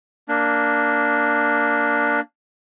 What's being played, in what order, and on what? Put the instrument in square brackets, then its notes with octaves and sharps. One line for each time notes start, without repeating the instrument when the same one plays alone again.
[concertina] A#3 D4